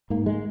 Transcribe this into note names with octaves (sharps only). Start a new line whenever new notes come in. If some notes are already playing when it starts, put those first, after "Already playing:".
G#2 A#3
G#3